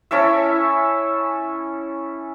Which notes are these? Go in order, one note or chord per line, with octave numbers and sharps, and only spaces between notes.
C#4 E4 A4 E5